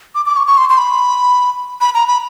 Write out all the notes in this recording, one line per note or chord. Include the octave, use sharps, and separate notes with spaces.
D6
D6
C#6
C#6
C6
C6
B5
B5
A#5
B5